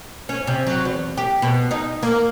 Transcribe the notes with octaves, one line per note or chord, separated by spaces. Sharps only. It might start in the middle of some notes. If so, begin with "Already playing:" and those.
C#4
C3
F#3
E2
G4
B2
D#4
A#3